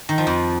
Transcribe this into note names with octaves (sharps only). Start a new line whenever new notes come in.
D#3
F3
F2